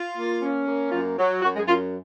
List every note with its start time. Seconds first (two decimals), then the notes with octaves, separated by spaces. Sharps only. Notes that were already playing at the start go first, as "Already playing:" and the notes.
Already playing: F4
0.17 A#3
0.41 C#4
0.66 A#3
0.92 F#2 F4
1.18 F#3
1.42 F#2 F#4
1.55 G#3 G#4
1.67 F#2 F4